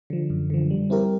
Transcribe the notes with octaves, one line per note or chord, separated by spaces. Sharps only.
D3 F3
F#2
D3 F3
G3
C4 E4 G4 A#4